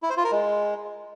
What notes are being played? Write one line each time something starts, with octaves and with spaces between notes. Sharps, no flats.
E4
C5
F4
A#4
G#3